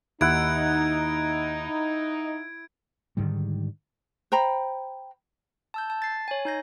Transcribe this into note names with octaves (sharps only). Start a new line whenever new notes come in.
D#2 D#4 E4 F#5 G#6 D7
G#2 D3 D#3 G3
C5 G5 A#5 B5
A5 E6 G6
A5
A6 C7
C#5 G#5
D#4 G6 A#6